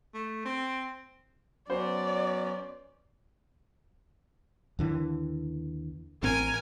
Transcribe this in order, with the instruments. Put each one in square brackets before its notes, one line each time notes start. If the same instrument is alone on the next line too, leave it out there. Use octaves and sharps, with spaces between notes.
[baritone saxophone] A3
C4
[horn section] F#3 B3 C#4 [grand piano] C5 [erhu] D5
[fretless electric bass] D#2 D3 E3
[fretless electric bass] A1 C4 [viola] A#4 G#5